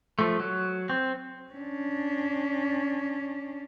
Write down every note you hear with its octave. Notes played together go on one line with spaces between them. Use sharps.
F3 A3
F#3
C4
C#4 D4